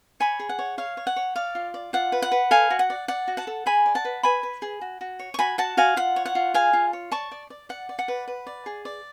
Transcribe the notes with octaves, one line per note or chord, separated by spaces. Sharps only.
C#5 G#5 B5
G#4
F#5
C#5
C#5 F5
C#5
F#5
C#5
D5 F5
F4
D5
F4 F#5
B4
F#5
B4
A4 F5 G#5
F#4
F#5
D5
D5 F#5
F#4
F#5 A5
A4
G#4 G#5 B5
D5
F#5 A5
B4
B4 G#5 B5
B4
G#4
F#4
F#4
C#5
C#6
F#4 G#5 B5
F#4 F#5 A5
F#4 F5 G#5
F4 F#5
C#5
F#5
F4
G#4 F5 G#5
F4
C#5
D5 A5 C#6
D5
D5
D5 F#5
D5
F#5
B4
B4
D5
G#4
D5